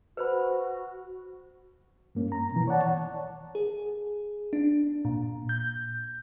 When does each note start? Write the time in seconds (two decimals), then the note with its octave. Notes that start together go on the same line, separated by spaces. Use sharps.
0.17 F#4 B4 C5 B5
2.15 G2 A#3 C#4
2.32 A#5
2.52 B2 E3
2.68 C#5 D5 F#5 A5
3.55 G#4
4.53 D4
5.05 A#2
5.49 G6